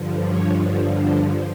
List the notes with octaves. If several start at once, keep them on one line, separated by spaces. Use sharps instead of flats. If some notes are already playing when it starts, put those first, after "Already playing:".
Already playing: G2 D3 F3
C#5
C5